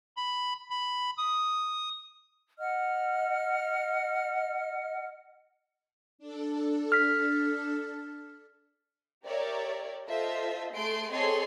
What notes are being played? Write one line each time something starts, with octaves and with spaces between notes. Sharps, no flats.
B5
B5
D#6
D#5 F#5 F6
D4 A4
F6 B6
G4 A#4 C#5 D5 E5
F4 A4 C5 D#5 E5
A3 G#4 C6 D7
C4 G#4 A4 C#5 D#5 C6